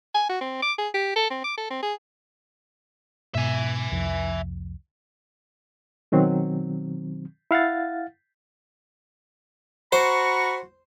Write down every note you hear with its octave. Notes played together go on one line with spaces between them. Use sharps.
G#5
F#4
C4
D6
G#4
G4
A4
C4
D6
A4
C4
G#4
G#2 B2 E5 G#5
C2 F2
B2 D#3 F#3 C4
E4 F5 F#5 A6
F#4 C5 A#5 B5 C#6